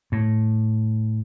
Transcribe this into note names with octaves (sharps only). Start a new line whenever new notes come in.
A2